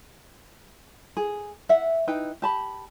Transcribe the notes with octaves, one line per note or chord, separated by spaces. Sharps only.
G#4
E5 F#5
D#4 E4 B4 G5
G4 A5 B5